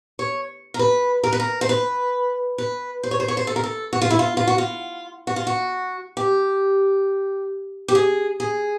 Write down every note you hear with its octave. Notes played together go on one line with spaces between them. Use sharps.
C#5
A#4
B4
A#4
B4
A#4
C5
B4
B4
C5
C#5
C5
C#5
C5
A4
A#4
A4
F#4
F4
E4
F4
F4
F#4
F4
F#4
F4
F#4
G4
G4
G#4
G#4